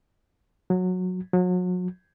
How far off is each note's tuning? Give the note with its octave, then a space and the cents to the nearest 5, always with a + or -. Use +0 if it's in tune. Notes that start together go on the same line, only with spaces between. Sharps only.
F#3 -15
F#3 -35